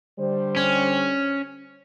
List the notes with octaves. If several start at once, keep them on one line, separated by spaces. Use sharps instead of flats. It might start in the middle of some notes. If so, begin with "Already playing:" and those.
D3 G3 C5
C#4